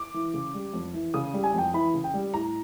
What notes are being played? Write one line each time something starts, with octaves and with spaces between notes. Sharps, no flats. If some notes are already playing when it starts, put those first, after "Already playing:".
Already playing: D6
E3
C#3
G3
F2
E3
C#3 D#6
G3
G#5
F2 G5
E3 B5
C#3
G5
G3
A2 A#5